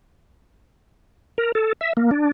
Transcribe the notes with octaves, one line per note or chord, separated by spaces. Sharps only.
A#4
A4
E5
A#3
D4